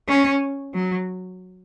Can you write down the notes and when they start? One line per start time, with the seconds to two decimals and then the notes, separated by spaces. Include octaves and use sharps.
0.09 C#4
0.74 F#3